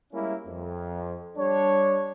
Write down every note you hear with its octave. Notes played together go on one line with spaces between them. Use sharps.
G3 G#3 A#3 C#4 E4
F2
G3 D4 C#5